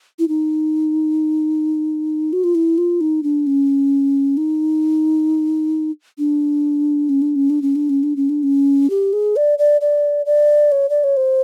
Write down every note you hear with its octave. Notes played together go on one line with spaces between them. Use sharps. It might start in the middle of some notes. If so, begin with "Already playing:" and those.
E4
D#4
F#4
F4
E4
F4
D#4
D4
C#4
D#4
D4
C#4
D4
C#4
D4
C#4
D4
C#4
D4
C#4
D4
C#4
G4
G#4
D5
D5
D5
D5
C#5
D5
C#5
C5